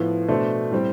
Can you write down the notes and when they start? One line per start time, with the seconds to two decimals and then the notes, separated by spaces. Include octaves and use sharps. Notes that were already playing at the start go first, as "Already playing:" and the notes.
Already playing: A2 F3 B3
0.28 B2 A3 D4 A4 C5
0.71 A2 G3 C4